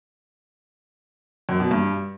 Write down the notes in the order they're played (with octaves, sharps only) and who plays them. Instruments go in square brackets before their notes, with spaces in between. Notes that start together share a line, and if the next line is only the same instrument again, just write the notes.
[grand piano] F#2
B2
G2